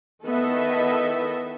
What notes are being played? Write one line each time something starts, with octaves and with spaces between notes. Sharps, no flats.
D#3 B3 E4 A4 D#5 E5